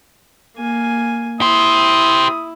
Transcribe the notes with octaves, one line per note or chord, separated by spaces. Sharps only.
A#3 G#5
E4 G4 C5 D#6